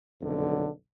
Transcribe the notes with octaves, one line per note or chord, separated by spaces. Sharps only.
F#1 B1 F2 D3